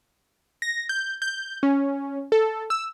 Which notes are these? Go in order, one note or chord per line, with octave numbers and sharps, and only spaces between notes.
A#6
G6
G6
C#4
A4
E6